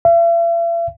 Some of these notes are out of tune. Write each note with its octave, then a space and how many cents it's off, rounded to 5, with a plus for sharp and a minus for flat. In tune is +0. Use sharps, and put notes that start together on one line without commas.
E5 +45